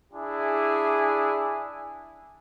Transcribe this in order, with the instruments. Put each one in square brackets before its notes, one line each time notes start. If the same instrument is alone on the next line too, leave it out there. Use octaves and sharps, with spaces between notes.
[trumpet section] D4 E4 G#4 G#5